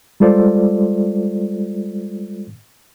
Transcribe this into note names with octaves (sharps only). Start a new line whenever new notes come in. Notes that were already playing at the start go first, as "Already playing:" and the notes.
G3 G#3 F4 A4 C5 D5